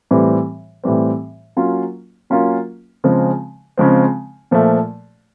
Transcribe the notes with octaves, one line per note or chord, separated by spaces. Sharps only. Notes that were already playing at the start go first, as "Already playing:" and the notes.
A2 E3 G3 C4
A2 E3 G3 C4
F#3 A#3 C#4 F4
F#3 A#3 C#4 F4
C#3 F3 G#3 C4
C#3 F3 G#3 C4
A#2 F3 A3